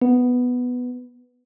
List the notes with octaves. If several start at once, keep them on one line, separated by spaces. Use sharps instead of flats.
B3